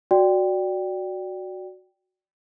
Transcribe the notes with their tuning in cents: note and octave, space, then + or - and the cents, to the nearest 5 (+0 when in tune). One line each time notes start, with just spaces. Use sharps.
F#4 -5 D5 +0 G5 +0